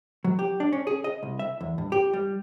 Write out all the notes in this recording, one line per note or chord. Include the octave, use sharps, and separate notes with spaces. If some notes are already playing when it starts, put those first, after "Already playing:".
F#3
G4
D4
C#4
G#4
D#5
C2
E5
E2
G2
G4
G3